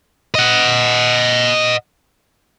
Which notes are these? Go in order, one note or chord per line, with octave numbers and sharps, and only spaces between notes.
D#5 F#5